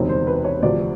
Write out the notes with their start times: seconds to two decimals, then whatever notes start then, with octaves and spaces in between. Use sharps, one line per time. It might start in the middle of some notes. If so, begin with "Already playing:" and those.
Already playing: E1 D2 C3 D#3 C#5
0.09 C5
0.27 B4
0.44 C#5
0.62 D2 C3 F3 D5